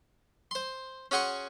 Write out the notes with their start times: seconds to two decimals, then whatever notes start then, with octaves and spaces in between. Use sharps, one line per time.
0.51 C5 C6
1.11 C#4 F#4 G#4 C6 C#6